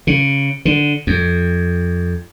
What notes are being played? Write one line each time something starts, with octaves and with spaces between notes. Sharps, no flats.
C#3
D3
F2